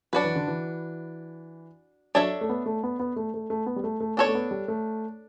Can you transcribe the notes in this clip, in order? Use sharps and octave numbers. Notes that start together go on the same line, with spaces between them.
F#3 D4 F#4 B4
E3
D3
E3
F#3 D4 A4 C#5 E5
A3
B3
A3
B3
B3
A3
A3
A3
B3
G3
A3
A3
B3 D4 A4 C#5
A3
B3
G3
A3